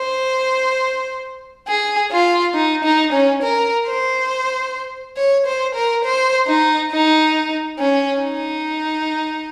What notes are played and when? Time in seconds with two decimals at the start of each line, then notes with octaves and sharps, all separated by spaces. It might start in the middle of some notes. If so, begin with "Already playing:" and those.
Already playing: C5
1.68 G#4
2.11 F4
2.54 D#4
2.84 D#4
3.12 C#4
3.42 A#4
3.86 C5
5.17 C#5
5.46 C5
5.75 A#4
6.04 C5
6.47 D#4
6.91 D#4
7.79 C#4
8.22 D#4